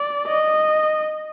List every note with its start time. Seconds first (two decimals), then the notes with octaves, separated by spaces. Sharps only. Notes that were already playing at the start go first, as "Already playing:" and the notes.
Already playing: D5
0.27 D#5